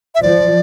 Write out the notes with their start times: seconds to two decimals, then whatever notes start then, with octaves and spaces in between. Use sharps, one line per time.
0.15 E5
0.23 F3 D5